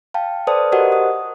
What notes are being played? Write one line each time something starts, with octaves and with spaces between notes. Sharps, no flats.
F5 G5 A5
A4 B4 C5 D5 A5 D#6
F#4 G4 A#4 C5 D#5 F#5
D#6